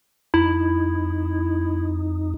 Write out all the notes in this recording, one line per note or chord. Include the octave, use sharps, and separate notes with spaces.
F2 D#4 E4